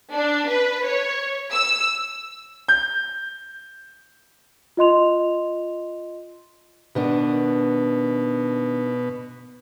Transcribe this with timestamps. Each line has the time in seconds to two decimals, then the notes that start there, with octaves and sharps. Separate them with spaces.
0.12 D4
0.48 B4
0.86 C#5
1.52 E6
2.68 G6
4.77 F4 D#5 C6 F7
6.95 B2 D#3 B3 D4